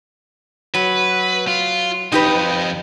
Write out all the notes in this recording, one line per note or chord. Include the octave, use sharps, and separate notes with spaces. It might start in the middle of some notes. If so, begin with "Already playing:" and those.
F#3 B4
F4
F2 D#4 G4 B4 D#5